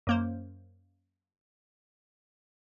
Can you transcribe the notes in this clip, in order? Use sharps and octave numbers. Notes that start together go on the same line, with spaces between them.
F#2 A#3 C5